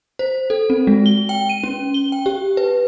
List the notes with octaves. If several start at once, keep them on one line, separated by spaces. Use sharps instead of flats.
C5
A4
C4
G#3
G7
G5
D#7
C#4
G7
G5
G4
B4